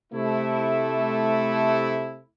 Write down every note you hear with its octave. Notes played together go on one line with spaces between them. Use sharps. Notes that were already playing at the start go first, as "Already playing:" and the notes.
C3 A3 E4